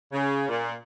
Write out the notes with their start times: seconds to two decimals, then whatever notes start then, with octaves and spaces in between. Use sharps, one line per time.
0.12 C#3
0.48 A#2